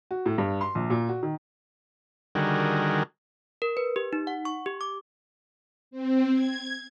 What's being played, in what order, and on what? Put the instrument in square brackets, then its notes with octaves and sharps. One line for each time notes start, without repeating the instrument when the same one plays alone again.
[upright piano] F#4
A2
G2
C6
A#1
A#2
F#4
D#3
[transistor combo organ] D3 D#3 G3 F#4 G#4 A#4
[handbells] A#4
B4
G4
D#4
F#5
C#6
G4
D6
[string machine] C4
G#6